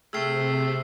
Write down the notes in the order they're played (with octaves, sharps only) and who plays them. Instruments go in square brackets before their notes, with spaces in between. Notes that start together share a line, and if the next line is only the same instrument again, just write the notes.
[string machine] C3 [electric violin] A3 [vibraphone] G#4 G5 [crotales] E6 F6 C7